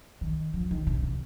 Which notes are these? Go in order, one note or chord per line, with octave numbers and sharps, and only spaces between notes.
D#3
F3
D#3
C3
C3